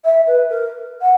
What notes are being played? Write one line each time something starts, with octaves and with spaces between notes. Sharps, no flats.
E5
B4
A#4
F#5